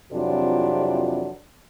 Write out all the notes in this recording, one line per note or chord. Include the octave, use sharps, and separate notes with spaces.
F2 C3 E3 F#3 D4 F4